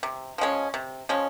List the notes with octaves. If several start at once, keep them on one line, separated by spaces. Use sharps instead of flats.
C3
F3 G#3 C#4
C3
F3 G#3 C#4